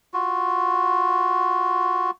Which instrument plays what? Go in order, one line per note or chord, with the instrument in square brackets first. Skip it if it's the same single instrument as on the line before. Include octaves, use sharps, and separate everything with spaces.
[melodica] F4 F#4